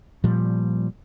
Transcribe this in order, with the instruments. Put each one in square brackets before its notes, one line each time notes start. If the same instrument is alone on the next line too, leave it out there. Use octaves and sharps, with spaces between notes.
[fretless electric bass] A#2 F3 G3